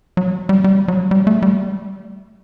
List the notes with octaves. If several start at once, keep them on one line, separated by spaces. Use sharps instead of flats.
F#3
G3
G3
F#3
G3
A3
G3